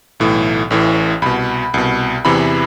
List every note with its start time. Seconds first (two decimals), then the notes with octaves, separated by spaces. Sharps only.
0.20 B1 A2 E3
0.71 A1 A2 E3
1.22 C2 B2 B5
1.74 C2 B2
2.25 E2 C3 E3 B5